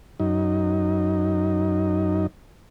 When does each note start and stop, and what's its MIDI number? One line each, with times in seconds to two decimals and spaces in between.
0.20 2.27 42
0.20 2.27 63